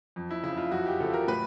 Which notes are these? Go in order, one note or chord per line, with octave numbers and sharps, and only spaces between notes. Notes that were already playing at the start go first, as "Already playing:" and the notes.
F2
E4
C#3 F3 E4
F4
F2 F#4
G4
C#3 F3 A4
A#4
A2 B4